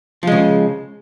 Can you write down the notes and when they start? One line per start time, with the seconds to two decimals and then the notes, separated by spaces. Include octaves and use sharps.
0.23 F3
0.27 G#3
0.32 C#3